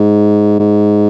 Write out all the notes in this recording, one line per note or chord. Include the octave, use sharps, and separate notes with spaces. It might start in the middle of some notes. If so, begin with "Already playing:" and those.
Already playing: G#2
G#2